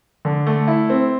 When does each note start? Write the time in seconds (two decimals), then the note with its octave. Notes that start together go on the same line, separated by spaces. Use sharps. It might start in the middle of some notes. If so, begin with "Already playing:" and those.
0.25 D3
0.47 A3
0.67 E4
0.90 C4